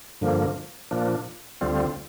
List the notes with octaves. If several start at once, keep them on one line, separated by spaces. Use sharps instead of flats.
G2 D3 F3 A#3
A#2 F3 A#3 D4
D2 D3 G3 C4 F4